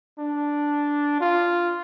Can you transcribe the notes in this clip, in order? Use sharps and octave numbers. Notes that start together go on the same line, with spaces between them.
D4
F4